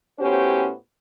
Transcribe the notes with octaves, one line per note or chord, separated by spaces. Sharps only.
A2 B3 C#4 F#4 G4 C5